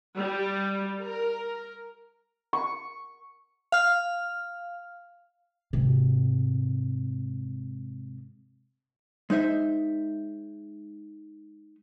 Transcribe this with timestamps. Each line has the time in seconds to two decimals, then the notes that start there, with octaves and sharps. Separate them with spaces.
0.17 G3
1.01 A#4
2.53 C#6
3.72 F5 F6
5.73 G#2 C3
9.30 G#3 D#4 C5 E5